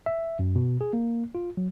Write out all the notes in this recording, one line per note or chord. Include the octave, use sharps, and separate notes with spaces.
E5
F#2
B2
G#4
A#3
F4
F#3